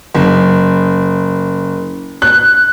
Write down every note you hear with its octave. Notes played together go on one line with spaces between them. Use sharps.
F#1
F#6